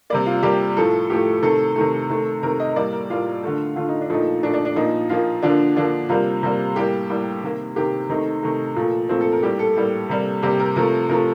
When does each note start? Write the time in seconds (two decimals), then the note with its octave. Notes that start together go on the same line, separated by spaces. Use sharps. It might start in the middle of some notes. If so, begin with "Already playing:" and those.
0.10 C3 G3 A#3 D5
0.26 F4
0.43 C3 G3 A#3 G4
0.76 A2 F3 A3 A4
1.10 A2 F3 A3 G4
1.42 C3 D#3 A3 A4
1.76 C3 D#3 A3
2.09 C3 D#3 A3
2.43 C3 D#3 A3 A#4
2.59 D#5
2.76 A2 G3 A#3 D5
2.92 A#4
3.10 A2 G3 A#3 F4
3.43 D3 A3
3.76 D3 A3 F4
3.89 D#4
4.01 D4
4.09 A#2 F3 A3 D#4
4.43 A#2 F3 A3 D4
4.54 D4
4.65 D4
4.76 A#2 F3 A#3 D#4
5.09 A#2 F3 A#3 F4
5.43 D3 F3 A#3 D4
5.76 D3 F3 A#3 D4
6.09 C3 G3 A#3 F4
6.43 C3 G3 A#3
6.76 A2 G3 A#3 G4
7.09 A2 G3 A#3
7.43 C3 D#3 A#3
7.76 C3 D#3 A#3 G4
8.09 C3 D#3 A3 D#4
8.43 C3 D#3 A3
8.76 A#2 F3 A3
9.09 A#2 F3 A3 C4
9.21 A4
9.32 A#4
9.43 A2 G3 A#3 G4
9.59 A4
9.76 A2 G3 A#3
10.09 C3 G3 A#3
10.43 C3 G3 A#3 G4
10.59 A#4
10.76 C3 F3 A3 A#4
11.09 C3 F3 A3 A#4